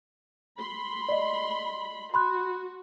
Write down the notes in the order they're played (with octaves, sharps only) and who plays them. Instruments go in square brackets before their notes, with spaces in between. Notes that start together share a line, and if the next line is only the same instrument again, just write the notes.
[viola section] B5 C6
[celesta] D5 D#5
[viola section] F#4 [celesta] B5 C6 F#6